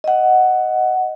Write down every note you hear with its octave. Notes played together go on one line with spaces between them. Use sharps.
D#5 F#5